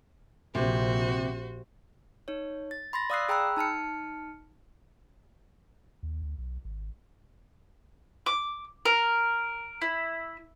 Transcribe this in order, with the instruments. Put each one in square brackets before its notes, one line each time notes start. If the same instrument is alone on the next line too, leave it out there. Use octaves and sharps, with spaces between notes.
[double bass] A#1 [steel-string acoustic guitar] C3 [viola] F#4 C5
[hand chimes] D#4 C#5
A6
B5 C6 A6 A#6
D5 F5 D#6 E6 F#6 C7
G#4 G5 A#5 B5 E6 F#6
D#4 A5 F6 C#7
[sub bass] D#2
D2
B1
G#1
[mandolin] D6
A#4
E4